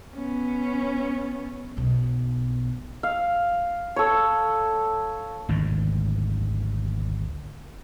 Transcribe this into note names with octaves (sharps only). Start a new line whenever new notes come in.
B3 C#4
B1 B2
F5
A4 C#5
G#1 D2 G#2 D#3